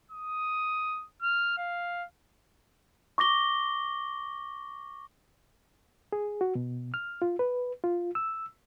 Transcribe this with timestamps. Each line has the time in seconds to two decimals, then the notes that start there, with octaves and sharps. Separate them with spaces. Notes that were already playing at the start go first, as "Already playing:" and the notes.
0.11 D#6
1.22 F6
1.57 F5
3.18 C#6 D6 A#6 G7
6.13 G#4
6.41 F#4
6.55 B2
6.94 F6
7.22 F4
7.39 B4
7.84 F4
8.15 E6